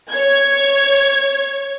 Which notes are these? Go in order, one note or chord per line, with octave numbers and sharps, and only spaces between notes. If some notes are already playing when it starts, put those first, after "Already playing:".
C#5 G#6